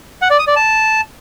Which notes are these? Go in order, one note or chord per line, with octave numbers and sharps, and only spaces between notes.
F#5
D5
D#6
D5
A5